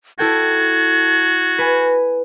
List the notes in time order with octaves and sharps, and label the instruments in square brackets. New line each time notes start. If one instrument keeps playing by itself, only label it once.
[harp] E4 A4 G5 [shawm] F#4 [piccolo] G#6
[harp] B4 G#5